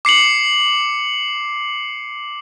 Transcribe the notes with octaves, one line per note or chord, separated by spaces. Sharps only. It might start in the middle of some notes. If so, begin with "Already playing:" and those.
D6 C7 C#7 F#7